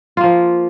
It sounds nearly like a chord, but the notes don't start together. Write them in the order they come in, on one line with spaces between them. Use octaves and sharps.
F4 A#3 F3